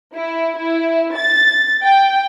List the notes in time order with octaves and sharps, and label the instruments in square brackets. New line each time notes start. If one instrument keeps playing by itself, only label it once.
[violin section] E4
E4
A6
G5